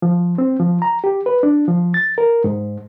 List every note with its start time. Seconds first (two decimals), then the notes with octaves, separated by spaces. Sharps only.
0.02 F3
0.38 C4
0.60 F3
0.82 A#5
1.04 G4
1.26 B4
1.43 D4
1.68 F3
1.94 A6
2.18 A#4
2.44 G#2